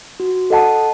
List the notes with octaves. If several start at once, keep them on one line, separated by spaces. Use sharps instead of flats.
F#4
A4 D#5 F#5 A5